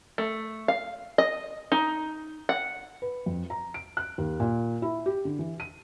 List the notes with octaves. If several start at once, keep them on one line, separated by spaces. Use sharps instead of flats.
A3
F5
D#5
D#4
F#5
B4
F2
A#5
D7
F#6
D#2
A#2
E4
G4
D3
E3
D#7